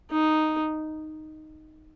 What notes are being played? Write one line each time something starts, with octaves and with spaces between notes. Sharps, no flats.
D#4